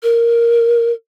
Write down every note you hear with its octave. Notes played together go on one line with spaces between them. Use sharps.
A#4